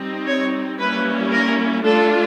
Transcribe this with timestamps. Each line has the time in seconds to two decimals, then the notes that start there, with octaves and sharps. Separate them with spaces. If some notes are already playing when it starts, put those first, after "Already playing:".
Already playing: G3 C4 D#4
0.26 C#5
0.79 G3 A#3 C#4 E4 B4
1.31 A#4
1.84 A3 D4 F4 A4